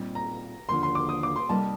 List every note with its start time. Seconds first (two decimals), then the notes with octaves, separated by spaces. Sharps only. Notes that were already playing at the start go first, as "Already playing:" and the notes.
Already playing: A#2 G3 C4 D#4
0.15 A#5
0.69 D#2 D3 F3 A#3 C6
0.83 C6
0.95 D6
1.09 D#6
1.23 D6
1.36 C6
1.49 C3 G3 A#3 D#4 A5